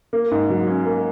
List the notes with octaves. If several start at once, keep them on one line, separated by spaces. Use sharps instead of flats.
A#3
G#2
F#3
C#4
A#3